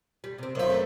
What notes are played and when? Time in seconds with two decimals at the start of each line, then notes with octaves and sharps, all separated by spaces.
0.24 G3
0.38 C3 C4
0.55 F#2 D#3 F4 C5 E5
0.70 A3 D4 B4